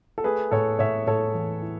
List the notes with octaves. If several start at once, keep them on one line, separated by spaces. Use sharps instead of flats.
A4
A3 G#4 B4
A2 A4 C#5
A2 C#5 E5
A2 A4 C#5
E3
E4